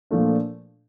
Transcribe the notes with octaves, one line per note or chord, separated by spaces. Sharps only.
A#2 F3 A3 D4